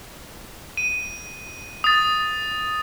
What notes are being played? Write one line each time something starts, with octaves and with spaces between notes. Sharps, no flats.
D#7
D#6 A6